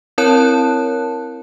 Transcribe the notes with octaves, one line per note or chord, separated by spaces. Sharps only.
C4 E4 A#4 C#5 A5 F#6